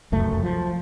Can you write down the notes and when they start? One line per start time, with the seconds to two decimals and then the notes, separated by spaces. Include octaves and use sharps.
0.12 F1 C#2 F#2 A3
0.43 F3